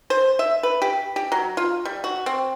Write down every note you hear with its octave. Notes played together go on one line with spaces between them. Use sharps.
C5
E5
B4
G4
G4
F#3
F4
G3
F#4
C4